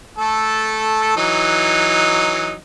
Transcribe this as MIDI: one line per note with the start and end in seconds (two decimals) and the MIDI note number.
0.18 1.16 57
0.18 1.16 69
1.17 2.54 52
1.17 2.54 54
1.17 2.54 63